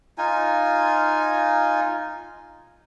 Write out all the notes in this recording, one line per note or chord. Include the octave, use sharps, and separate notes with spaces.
D#4 F4 G#5